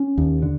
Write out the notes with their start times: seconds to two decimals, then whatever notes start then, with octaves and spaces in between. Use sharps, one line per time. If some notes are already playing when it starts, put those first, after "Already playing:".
Already playing: C#4
0.18 D#2
0.42 D3